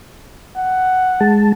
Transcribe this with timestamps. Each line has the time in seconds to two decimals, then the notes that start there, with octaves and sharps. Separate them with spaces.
0.56 F#5
1.21 G#3 A5